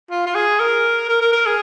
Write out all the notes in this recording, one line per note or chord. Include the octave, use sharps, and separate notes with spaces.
F4
F4
G#4
A#4
A#4
A#4
A#4
G#4